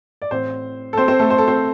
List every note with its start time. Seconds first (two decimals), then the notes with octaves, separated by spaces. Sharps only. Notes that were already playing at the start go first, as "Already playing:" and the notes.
0.22 D5
0.31 A1 A2 C4 C5
0.93 A4
0.97 C4 C5
1.08 C4 C5
1.19 A3 A4
1.30 C5
1.38 A4
1.47 C4 C5